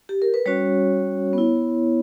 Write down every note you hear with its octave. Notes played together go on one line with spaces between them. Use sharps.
G4
A#4
B4
G3 C#4 F#4 C#5
B3 E4